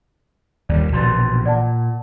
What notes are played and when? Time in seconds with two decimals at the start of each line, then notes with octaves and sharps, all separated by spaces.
0.69 D#2 F#3 G3 D5
0.92 A#1 B2 E3 F#4 C6 A6
1.46 A#2 D5 F#5 A5